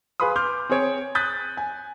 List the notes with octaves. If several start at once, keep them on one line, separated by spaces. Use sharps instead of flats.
G#4 B4 F5 B5 C6 D#6
C6 D6 F6 G6
C4 G#4 C#5 D7
D#6 F#6 G6 A6 B6
G#5